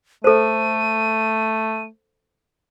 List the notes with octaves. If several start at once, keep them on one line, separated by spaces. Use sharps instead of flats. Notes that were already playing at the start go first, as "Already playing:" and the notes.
A3 A4 C5 D#7